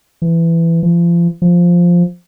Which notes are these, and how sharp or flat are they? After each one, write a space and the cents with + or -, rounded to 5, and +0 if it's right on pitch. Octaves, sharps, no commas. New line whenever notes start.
E3 +15
F3 -35
F3 +0